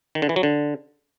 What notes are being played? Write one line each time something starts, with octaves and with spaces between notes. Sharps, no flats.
D#3
D3
E3
F#3
D3